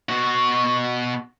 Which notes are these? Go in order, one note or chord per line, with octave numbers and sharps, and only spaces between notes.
B2 F#4